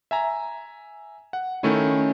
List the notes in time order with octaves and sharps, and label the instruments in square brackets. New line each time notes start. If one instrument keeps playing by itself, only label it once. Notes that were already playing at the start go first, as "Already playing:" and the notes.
[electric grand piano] E5 G#5 A#5
F#5
[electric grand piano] D#3 A3 E4 [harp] C#4